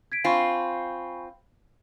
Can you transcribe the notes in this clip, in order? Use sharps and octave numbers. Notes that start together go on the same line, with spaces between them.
G#6 B6 D7
C4 F4 G#5 B5 C#6